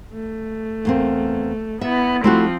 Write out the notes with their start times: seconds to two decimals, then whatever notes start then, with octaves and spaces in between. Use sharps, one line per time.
0.13 A3
0.85 E2 A#3 C4
1.81 B3 E4 E5
2.24 F3 A3 C4 E4 F#4